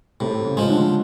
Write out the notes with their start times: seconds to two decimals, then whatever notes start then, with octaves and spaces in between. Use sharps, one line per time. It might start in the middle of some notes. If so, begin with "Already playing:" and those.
0.20 A2 C3 C4
0.45 C#3 C#4
0.57 F3 G#3
0.68 D3 D4